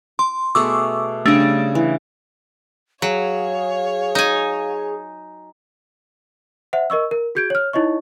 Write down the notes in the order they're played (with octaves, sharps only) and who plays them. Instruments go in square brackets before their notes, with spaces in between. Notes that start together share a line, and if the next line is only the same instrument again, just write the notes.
[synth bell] C6 [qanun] D6
[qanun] B2 A3 G#4 [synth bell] C#6 D6 E6
[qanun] C#3 G3 [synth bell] A3 D4
[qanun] E3
[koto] F#3 [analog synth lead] G#4 [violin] C#5 [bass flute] F5
[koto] D#4 G#5
[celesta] C5 E5 F#5
A#4 D#5 C#6 E6
A#4
F#4 G#4 G6 G#6 D7
C#5 F6
D#4 E4 C#5 D#5 C#6